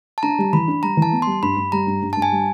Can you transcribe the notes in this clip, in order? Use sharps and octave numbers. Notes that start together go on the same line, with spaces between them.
A5
D4 A#5
G3
E3 B5
D4
G3 A#5
E3
A5
B3
G3 C6
G2 B5
G2
G3 A#5
G2
G2
A5
G2
G#5
G3